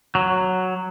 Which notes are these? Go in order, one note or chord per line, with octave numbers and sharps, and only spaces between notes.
F#3